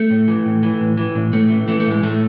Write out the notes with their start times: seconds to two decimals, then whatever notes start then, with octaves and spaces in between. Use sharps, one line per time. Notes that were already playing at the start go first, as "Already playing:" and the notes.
Already playing: A3
0.10 A2
0.28 E3
0.45 A2
0.63 E3
0.80 A2
0.97 E3
1.15 A2
1.33 A2 A3
1.50 E3
1.68 E3 A3
1.80 A3
1.86 A2 G#3
2.03 A2 A3